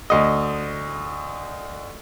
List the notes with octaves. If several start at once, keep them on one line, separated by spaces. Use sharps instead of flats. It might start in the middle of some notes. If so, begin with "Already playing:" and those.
D2 D#5